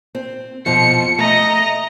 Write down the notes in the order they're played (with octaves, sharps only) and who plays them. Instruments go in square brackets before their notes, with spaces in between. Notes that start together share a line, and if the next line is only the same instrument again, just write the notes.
[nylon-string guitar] C4
[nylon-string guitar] F2 B2 F3 [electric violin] C#7
[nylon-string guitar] A3 [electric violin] D#5 A#5